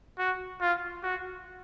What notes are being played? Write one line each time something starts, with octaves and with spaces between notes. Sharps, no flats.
F#4
F4
F#4